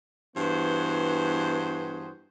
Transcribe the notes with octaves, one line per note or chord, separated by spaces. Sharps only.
G2 E3 B3 F#4 G#4 C5